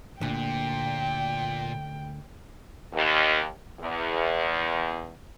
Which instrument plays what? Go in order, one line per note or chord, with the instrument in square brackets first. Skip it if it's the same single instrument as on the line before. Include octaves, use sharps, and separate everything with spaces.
[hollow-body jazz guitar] D2 D3 [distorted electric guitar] A#2 [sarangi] G5
[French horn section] D#2
E2